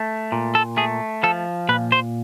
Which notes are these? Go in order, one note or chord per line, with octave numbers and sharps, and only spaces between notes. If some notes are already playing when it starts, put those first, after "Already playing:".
Already playing: A3
A#2
A4
A3 G#4
F3 A4
A#2 B4
C5